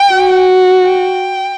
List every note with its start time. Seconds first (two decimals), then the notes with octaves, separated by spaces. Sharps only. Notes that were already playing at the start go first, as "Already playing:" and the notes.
Already playing: G5
0.14 F#4
0.84 G5